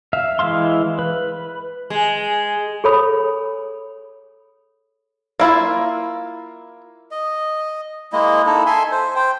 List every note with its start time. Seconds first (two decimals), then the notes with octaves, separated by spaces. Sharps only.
0.13 E5 F5
0.39 E3 G#3 E5 F5 C6
0.99 B4
1.90 G#3
2.84 G#4 A4 C#5 B5 D#6
5.40 A#3 E4 F4
7.11 D#5
8.13 G#3 A#3 E4 D#5
8.46 D#4 E4 A4
8.66 A4 E5 G#5 C6
8.91 C5
9.16 C5 G5